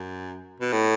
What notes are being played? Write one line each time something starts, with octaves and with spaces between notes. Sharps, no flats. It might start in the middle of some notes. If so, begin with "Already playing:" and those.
Already playing: F#2
B2
A2